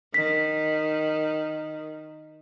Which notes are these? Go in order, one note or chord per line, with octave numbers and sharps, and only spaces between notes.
D#3 B6